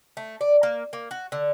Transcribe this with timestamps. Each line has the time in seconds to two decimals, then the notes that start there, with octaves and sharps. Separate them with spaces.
0.17 A3
0.41 D5
0.63 A#3
0.93 A#3
1.11 F#4
1.32 D3